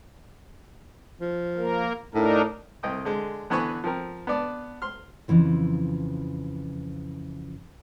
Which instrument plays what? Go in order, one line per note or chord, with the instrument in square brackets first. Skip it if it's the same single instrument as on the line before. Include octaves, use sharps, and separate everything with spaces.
[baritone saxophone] F3
[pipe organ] A#3 A#4
[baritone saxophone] A2 [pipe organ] D4 D#4 A#4
[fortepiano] C2 D#5 G5 D#6
D3 G#3
D3 E3 B3 G#5 B5 C#6
F3 C4 A#4
B3 D4 D5 A5
C6 F6
[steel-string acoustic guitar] F2 A2 C#3 E3 F3